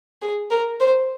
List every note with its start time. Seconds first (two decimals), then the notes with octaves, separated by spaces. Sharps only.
0.22 G#4
0.51 A#4
0.80 C5